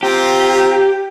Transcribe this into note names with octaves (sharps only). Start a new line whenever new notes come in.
C4 F4 G4 A#5